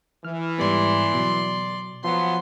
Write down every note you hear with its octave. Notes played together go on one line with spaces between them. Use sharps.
E3 F6
G#2 G3 B3 D5 C6
B2 F#3
F3 F#3 B3 C6